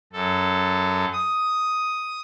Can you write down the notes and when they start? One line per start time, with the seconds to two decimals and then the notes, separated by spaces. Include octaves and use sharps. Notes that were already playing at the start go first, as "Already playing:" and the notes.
0.13 F#2 A4
1.13 D#6